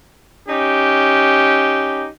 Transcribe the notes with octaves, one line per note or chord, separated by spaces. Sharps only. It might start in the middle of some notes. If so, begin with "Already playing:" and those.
C#4 D#4 G4